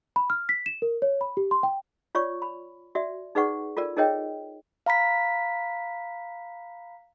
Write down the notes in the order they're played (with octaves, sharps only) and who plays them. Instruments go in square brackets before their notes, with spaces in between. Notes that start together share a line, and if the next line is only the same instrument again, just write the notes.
[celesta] B5
F6
B6
E7
A#4
C#5
B5
G4
C6
G5
[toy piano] F4 C#5 D5 C#6
B5
F#4 D5 E5
D#4 G#4 B4 D5 F#5 C#6
F4 A4 A#4 D5
D#4 G#4 A#4 C#5 D#5 G5
[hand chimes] F5 A#5 B5 B6